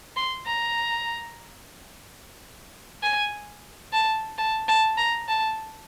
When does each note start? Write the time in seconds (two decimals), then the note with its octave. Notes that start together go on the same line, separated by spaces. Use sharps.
0.16 C6
0.46 A#5
3.03 G#5
3.93 A5
4.38 A5
4.68 A5
4.97 A#5
5.28 A5